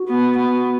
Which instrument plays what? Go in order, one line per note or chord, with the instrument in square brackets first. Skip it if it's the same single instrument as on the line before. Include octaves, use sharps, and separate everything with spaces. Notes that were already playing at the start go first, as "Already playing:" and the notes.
Already playing: [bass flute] F#4
[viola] B3
B3